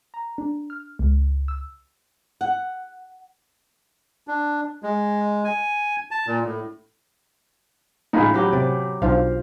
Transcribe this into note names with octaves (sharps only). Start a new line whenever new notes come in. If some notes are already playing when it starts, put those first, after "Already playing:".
A#5
D4
F6
C#2
E6
F#5
D4
G#3
G#5
A5
A#2
A2
A2 C#3 E3 D#4 F4 B4
F#3 G4
C3 D5
B1 F3 D4 F4 F5